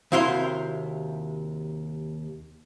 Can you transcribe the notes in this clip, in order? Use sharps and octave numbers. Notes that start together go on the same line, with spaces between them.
D#2 C3 E4 F#4 F5 C6